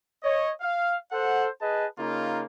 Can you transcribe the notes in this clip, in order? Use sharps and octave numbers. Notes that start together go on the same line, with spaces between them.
C#5 D#5
F5
A4 C5 F#5
G#4 B4 D#5 A5
C#3 A#3 D#4 F4